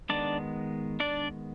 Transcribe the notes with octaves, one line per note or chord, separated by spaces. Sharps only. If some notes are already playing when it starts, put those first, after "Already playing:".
D#3 G#3 B3 D4 D5
D4 D5